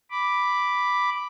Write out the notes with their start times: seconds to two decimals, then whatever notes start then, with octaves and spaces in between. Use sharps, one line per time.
0.11 B5 D6